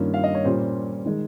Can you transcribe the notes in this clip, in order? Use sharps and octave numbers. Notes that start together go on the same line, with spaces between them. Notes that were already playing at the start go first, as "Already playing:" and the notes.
Already playing: G2 D#3 A#3 C#4 F4
F5
D#5
C#5
A#2 G3 C#4 C5
D#3 G#3